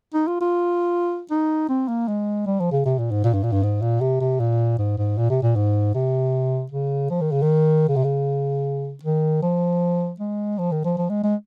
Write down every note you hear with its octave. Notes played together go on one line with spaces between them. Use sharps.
D#4
F4
F4
D#4
C4
A#3
G#3
G3
F3
C#3
C3
A#2
G#2
A#2
G2
A#2
G2
G#2
A#2
C3
C3
A#2
G#2
G#2
A#2
C3
A#2
G#2
C3
C#3
F3
D#3
C#3
D#3
C#3
C3
C#3
D#3
F3
G#3
F3
D#3
F3
F3
G#3
G#3